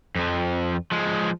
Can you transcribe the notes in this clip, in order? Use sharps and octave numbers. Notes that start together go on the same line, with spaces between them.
F2 F3
F3 G#3